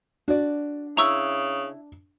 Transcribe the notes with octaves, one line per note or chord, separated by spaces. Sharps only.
D4 F#4 D5
C#3 E4 A#5 C#6 E6